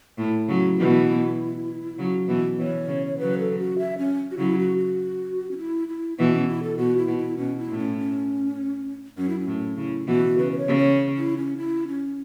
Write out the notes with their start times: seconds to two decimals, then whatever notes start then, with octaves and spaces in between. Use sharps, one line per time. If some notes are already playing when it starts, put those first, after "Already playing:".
0.18 A2 E4
0.48 C#3 F#3
0.78 B2 E3
1.98 C#3 F#3
2.28 B2 E3
2.59 B2 E3 C#5
2.88 C#3
3.06 C#5
3.18 C#3 F#3 B4
3.39 A4
3.59 F#4
3.78 E5
3.98 C#4
4.31 F#4
4.38 C#3 F#3 E4
4.58 F#4
4.78 F#4
5.51 C#4
5.58 E4
5.88 E4
6.18 B2 E3 E4
6.33 C#4
6.48 E4
6.63 A4
6.78 B2 F#4
6.98 E4
7.07 B2
7.18 E4
7.37 B2 C#4
7.58 E4
7.68 A2
7.78 C#4
7.98 C#4
9.17 F#2 C#4
9.29 E4
9.40 C#4
9.47 A2
9.77 C#3 E4
10.07 B2 E3 F#4
10.37 C#3 B4
10.52 B4
10.58 C#5
10.67 C#3
10.78 C#5
11.17 E4
11.37 C#4
11.57 E4
11.88 C#4